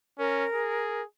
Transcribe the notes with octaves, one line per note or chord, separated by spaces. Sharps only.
C#4 A#4
G#4